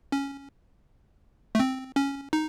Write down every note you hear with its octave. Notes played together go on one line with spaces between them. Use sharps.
C#4
A3
C4
C#4
D#4